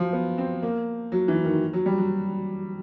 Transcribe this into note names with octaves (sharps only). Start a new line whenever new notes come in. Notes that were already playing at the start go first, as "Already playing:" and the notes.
Already playing: F3 F#3
B3
C4
A#3
F#3
E3
D#3
F#3
G3
F#3